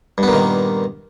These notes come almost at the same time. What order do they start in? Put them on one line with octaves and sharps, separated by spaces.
G2 B3 A#2 D#3